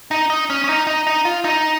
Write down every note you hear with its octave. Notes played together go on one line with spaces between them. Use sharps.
D#4
D#4
C#4
C#4
D#4
D#4
D#4
F4
D#4